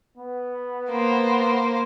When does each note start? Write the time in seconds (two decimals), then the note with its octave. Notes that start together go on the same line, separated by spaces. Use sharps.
0.18 B3
0.90 A#3 C5